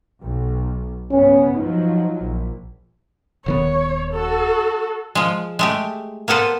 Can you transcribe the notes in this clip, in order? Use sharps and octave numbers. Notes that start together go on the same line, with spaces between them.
B1
G2 C#3 B3 C#4
F3 F#3 D#4
A#1
D#1 D#3 B3 C#5
F#4 A4
F3 G#3
G#3 A3 G4
A#3 B3 A4 B4 C5